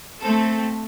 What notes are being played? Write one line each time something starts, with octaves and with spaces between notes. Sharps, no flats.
A3 C4 A4